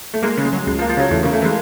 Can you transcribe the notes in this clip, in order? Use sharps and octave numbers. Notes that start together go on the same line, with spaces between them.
A3
G#3 A#3
C#3
G#3
F#3
C#2 G#3
F3
A#3
F3
C#3 F#3
E2 A3
C#3 A#3
A3
E3 G#3